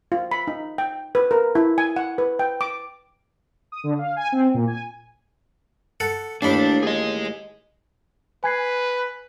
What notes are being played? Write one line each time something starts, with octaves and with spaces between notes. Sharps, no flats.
F4
B5
D#4
G5
B4
A#4
E4
G#5
F#5
B4
G5
D6
D#6
D3
F5
G#5
C4
A#2
G#5
A4 F#5
A1 D#2 D4 B5
G#4 D#5
B4 G#5 G#6 C7